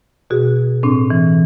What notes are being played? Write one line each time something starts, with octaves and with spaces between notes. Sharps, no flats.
B2 F#4 G#4
A2 C4 D4
E3